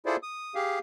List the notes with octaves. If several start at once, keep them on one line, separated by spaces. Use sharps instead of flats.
E4 F4 G#4 A4 C5 D5
D#6
G4 G#4 F5